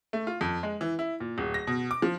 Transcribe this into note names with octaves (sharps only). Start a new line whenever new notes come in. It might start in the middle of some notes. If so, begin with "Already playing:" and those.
A3
F4
F2
G#3
E3
E4
A#2
D1
A#6
B2
D6
F3